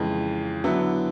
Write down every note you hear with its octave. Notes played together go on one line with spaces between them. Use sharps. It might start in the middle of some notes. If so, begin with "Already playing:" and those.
Already playing: F2 C#3 E3 G#3
D3 F#3 B3 E4